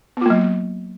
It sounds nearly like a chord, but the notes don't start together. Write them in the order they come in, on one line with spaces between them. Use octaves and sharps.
B3 F4 A#3 F#3